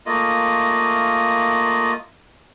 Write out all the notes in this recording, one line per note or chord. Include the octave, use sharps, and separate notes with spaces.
A3 A#3 F4 D#5